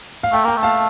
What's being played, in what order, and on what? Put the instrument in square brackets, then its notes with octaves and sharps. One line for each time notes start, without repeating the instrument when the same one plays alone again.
[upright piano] F5
[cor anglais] A3 [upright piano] G5
[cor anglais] A#3 [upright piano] G5
[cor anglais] A3
[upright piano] F5 A5